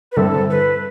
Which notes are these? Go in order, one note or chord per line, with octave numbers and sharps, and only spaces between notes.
B4
G2 D3 G3 C4 E4 A4
B4